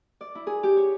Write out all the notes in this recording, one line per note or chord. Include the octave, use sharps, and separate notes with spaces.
D5
E4
G#4
G4
C#5